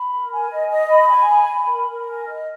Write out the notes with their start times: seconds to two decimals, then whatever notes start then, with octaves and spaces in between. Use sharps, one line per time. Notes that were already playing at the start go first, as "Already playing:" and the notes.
Already playing: B5
0.11 A#4
0.31 G#5
0.50 D#5
0.69 D#5
0.90 B5
1.09 G#5
1.28 B5
1.48 B5
1.67 A#4
1.87 A#4
2.06 G#5
2.26 D#5